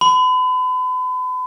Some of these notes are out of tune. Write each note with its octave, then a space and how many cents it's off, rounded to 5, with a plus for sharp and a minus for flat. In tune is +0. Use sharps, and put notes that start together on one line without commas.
B5 +40